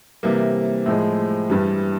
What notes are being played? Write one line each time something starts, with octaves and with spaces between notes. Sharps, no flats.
C3 E3 G3 A#3
A2 F3 G#3
G2 E3 G3